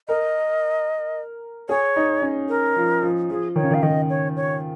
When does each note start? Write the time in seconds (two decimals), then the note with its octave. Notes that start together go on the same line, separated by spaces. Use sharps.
0.08 A#4 D#5
1.69 G#4 C#5
1.96 D#4
2.22 C#4
2.49 A#4
2.76 F3
3.02 F3
3.30 F3 G#4
3.56 D#3 C#5
3.63 C#3
3.71 D#3
3.74 F5
3.83 D#3 D#5
4.10 C#5
4.37 C#5